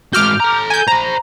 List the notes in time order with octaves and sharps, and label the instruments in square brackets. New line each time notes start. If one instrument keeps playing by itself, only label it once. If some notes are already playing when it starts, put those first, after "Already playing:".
[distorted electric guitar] G#2 F#4 [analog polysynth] D6 F6 G6
[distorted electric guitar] A4 A#5
[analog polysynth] G#5 G6
[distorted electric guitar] C5 B5 [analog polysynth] A#5